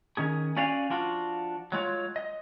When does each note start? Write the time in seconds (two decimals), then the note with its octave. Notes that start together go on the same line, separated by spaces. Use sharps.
0.17 D#3 C#4 G#4
0.56 C#4 F#4 D5 F5 G#5
0.90 F3 D4 F4 F#4
1.72 F#3 G#3 F4 C#5
2.16 D#5